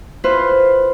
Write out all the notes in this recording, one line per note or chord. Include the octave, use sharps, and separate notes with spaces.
E4 F4 B4 C5